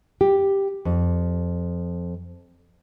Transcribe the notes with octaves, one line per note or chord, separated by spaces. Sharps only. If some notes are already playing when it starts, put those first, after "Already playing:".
G4
F2